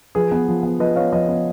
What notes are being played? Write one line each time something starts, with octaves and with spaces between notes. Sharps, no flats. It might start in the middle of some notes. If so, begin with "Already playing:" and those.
F3 G#4 B4
B3
F3
B3
F3 B4 D#5
B3 C#5 F5
F3 B4 D#5
B3